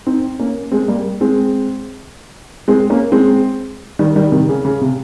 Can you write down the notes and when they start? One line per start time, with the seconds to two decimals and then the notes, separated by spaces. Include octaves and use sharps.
0.07 C4 D#4
0.39 A#3 C#4
0.72 G#3 C4
0.88 G3 A#3
1.21 G#3 C4
2.68 G#3 C4
2.90 A#3 C#4
3.12 G#3 C4
3.99 D#3 G3
4.16 D#3 G3
4.32 C3 D#3
4.49 C#3
4.65 C#3
4.81 C3